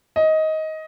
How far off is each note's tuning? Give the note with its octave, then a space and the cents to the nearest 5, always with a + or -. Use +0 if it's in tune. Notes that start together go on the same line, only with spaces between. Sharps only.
D#5 +15